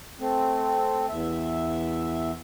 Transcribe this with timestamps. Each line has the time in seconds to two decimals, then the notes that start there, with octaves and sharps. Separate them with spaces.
0.20 A3 C4
1.09 E2 E5